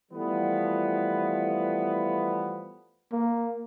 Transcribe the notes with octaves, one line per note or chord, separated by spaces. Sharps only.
E3 F3 G3 A3 B3
A#3